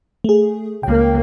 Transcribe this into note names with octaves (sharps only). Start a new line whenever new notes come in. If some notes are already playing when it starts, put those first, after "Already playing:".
A3 G#4
C#2 A#3 G5